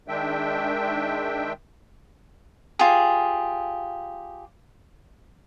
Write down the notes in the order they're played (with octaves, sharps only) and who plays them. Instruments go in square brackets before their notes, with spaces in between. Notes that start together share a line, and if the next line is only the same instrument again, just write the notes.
[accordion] D#3 G#3 D4 E5 G5
[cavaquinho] F4 G4 G#4